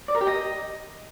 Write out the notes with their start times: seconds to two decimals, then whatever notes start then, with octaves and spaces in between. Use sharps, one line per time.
0.08 D5
0.15 A#4
0.21 G4
0.27 D#5